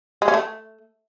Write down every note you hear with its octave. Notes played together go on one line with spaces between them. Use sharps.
G#3
C#4
A3